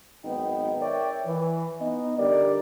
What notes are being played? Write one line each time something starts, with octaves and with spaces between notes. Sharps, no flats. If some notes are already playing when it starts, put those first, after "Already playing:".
G#1 F#3 B3 D#4 G5
A#4 C#5 D5 E5 G5
E3
B3 D#4 D#5
D3 G3 G4 A#4 D5